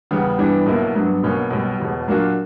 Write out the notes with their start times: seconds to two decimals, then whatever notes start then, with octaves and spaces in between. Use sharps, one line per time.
0.11 E2 C#3 G3 B3
0.38 G2 E3 G3 B3 D4
0.66 B1 B2 A#3 E4
0.95 G2 F#3 B3 D4
1.23 B1 B2 A#3 C#4
1.50 B1 B2 G3
1.80 E1 E2 B2
2.08 A#2 F#3 A#3 D4 F#4